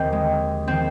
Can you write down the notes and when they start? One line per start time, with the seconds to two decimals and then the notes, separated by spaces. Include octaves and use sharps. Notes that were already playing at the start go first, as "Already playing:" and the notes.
Already playing: D#2 D#3 C4
0.12 G#3
0.68 D#3 C4